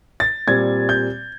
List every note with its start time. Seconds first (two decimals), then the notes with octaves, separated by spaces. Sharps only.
0.20 A6
0.48 A#2 G3 C4 G#6
0.89 G6